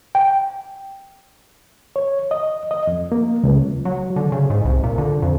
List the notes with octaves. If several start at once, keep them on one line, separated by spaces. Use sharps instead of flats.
G5
C#5
D#5
D#5
F2
A#3
C#2
F#3
D3
C#3
G#2
C2
A#2
D3
F2